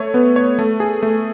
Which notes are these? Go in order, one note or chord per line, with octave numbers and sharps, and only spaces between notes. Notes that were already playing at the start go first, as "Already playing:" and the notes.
Already playing: A3 C#5
B3
C#5
A3
G#4
A3